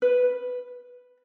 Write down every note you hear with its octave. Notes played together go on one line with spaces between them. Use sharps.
B4